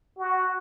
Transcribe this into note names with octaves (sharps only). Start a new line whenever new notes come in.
F#4